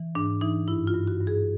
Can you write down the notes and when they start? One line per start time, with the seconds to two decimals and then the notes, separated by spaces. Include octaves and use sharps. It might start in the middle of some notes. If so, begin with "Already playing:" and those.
Already playing: E3
0.15 G#2 D4
0.41 E3 D#4
0.68 G2 E4
0.87 F4
0.94 G2
1.07 F#4
1.20 G2
1.27 G#4